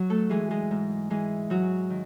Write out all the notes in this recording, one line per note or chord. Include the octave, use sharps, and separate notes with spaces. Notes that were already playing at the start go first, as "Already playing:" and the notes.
Already playing: F#3 F#4
A3 A4
E3 G#3 G#4
G#3 G#4
G#2
E3 G#3 G#4
G#2 F#3 F#4
D#3